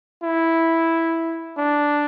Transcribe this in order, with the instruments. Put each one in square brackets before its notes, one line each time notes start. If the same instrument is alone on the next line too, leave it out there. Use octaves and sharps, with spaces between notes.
[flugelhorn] E4
D4